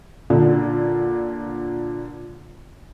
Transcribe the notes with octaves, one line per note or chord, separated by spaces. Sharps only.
A#2 D3